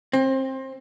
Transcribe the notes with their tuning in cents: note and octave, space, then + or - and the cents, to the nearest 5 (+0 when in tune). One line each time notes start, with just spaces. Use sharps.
C4 +25